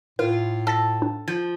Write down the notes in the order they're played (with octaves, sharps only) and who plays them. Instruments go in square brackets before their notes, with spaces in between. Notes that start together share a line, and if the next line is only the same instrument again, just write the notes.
[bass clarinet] A2 [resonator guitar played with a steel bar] F4 [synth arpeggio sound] A#4
[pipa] A4 [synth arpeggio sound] E6 A6 A#6
[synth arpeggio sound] D4
[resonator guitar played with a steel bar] F3 [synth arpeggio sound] G6